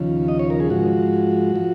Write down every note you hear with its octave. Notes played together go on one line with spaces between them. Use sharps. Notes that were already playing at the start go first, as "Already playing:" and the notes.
Already playing: D#2 C#3 F3
D#5
C#5
A#4
G#4
G#2 F3 F#4
F3